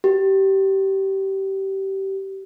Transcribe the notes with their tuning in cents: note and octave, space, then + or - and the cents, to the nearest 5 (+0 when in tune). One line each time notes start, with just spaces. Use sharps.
G4 -20